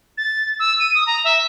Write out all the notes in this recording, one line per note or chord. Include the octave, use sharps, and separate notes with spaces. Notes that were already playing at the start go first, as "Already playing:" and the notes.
A6
E6
D#7
D#6
A#5
E5